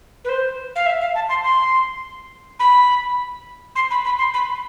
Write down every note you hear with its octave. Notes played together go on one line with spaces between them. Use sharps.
B4
C5
F5
E5
F5
A5
C6
C6
B5
C6
B5
B5
C6
B5